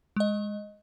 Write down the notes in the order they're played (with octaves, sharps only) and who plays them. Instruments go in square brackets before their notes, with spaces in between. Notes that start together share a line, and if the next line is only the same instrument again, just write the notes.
[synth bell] G#3 D#5